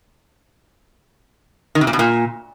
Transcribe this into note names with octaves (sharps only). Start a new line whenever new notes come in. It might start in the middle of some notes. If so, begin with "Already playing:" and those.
D#3
C3
A#2
B2
A#2